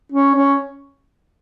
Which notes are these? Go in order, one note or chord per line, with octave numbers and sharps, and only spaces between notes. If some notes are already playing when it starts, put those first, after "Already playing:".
C#4
C#4